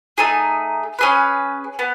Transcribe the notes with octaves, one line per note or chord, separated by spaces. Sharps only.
A3 D#4 G#4
C#4 G#4 B4
B3